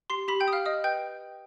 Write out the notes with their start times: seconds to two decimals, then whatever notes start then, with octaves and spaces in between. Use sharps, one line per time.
0.10 G4 C6 C7
0.28 G4 B5 B6
0.40 G5 G6
0.47 G4 D#6
0.53 F5 F6
0.65 D#5 F5 D#6
0.84 B4 G5 G6